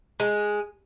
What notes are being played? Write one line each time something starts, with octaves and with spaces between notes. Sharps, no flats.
G#3